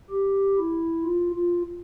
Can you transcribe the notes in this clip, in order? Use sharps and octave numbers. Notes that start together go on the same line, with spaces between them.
G4
E4
F4
F4